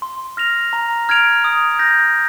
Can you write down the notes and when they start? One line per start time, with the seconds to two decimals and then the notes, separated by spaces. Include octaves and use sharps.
0.02 C6
0.37 F6 A#6 F7
0.73 A#5
1.09 F6 G#6 D7 F7
1.44 D#6
1.79 G6 A#6